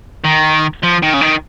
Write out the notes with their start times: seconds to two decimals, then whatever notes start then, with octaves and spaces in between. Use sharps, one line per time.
0.24 D#3
0.83 F3
1.02 D#3
1.14 C#3
1.21 D#3